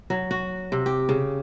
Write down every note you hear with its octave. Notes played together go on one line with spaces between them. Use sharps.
F#3
F#4
C3
G4
C#3